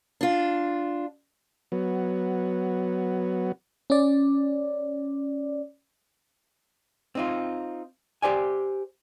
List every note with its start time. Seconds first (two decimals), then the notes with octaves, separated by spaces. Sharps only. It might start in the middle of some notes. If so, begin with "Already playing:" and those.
0.21 D4 F4
1.72 F#3 B3
3.90 C#4 D5
7.15 C4 D#4 F4
8.22 G4 C5 D5 G#5